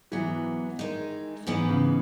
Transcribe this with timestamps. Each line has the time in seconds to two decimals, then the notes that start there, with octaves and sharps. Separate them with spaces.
0.12 G#2 E3 F#3 B3
0.79 D#3 G#3 D#4
1.47 G#2 E3 B3 D#4
1.69 C#3